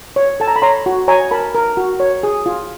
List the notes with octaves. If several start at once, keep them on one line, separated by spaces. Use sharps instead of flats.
C#5
A4 A5
A#5
B5
C#5 A#5 C6
F#4
C#5 G#5 A#5
A#4 A5 B5
A#4
F#4
C#5
G#4
F4